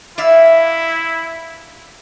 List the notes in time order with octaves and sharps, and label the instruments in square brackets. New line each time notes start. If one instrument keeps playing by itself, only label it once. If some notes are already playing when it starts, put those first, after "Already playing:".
[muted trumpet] E4 [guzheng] D5 E5 F5